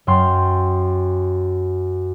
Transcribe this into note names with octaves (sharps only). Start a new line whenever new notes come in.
F#2 F#3 G5 C6 F6